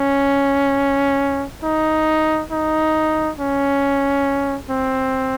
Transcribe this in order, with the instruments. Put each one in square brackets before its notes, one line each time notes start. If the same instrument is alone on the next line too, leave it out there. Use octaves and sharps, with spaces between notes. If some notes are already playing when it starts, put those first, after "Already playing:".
Already playing: [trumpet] C#4
D#4
D#4
C#4
C4